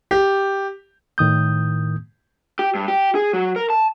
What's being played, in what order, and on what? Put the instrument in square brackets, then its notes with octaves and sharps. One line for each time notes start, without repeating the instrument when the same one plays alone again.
[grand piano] G4
[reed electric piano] A2 D#3 D#6 G6
[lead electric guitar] G4
G2
G4
G#4
F#3
A#4
A5